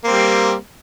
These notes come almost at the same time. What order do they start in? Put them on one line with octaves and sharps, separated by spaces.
A#3 C4 G3